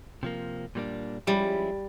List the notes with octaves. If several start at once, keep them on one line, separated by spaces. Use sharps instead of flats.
C3 F3 A#3
A#2 G3 A#3 D4
F3 G3 G#3 C#4 E4